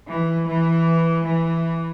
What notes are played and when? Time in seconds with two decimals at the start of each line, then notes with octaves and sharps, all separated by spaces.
0.09 E3
0.47 E3
1.25 E3